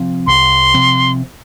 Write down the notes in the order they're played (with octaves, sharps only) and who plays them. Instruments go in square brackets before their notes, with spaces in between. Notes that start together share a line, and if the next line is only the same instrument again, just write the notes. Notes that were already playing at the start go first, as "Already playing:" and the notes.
Already playing: [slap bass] C3 F3 C4
[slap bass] C2 [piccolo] C6
[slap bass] C3 F3 C4